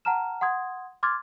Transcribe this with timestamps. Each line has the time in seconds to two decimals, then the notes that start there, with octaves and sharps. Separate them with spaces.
0.05 F#5 A5 A#5 F6 E7
0.41 F#5 C6 D#6 G#6
1.03 C6 D6 F6 G#6 A6